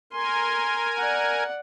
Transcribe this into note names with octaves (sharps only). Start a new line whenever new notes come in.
A#4 G#5 C6
D5 F#5